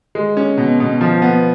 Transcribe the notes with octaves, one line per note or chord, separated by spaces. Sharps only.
G#3
C#4
B2
B2
F3
B3